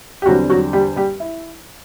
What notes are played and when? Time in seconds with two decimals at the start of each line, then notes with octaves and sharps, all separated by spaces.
0.22 G4
0.26 E2 D3 F#3 G3 C4 F#4
0.49 F#3 F#4
0.73 G3 G4
0.96 G3 G4
1.20 E4